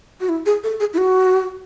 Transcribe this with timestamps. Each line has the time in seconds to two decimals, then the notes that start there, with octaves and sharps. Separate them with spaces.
0.21 F#4
0.29 E4
0.46 G#4
0.64 A4
0.80 G#4
0.94 E4
0.98 F#4